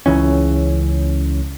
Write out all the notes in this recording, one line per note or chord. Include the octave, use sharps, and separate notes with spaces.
C#2 C#3 E3 C#4